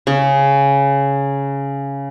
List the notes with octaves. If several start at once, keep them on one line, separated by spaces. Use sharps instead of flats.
C#3 C#6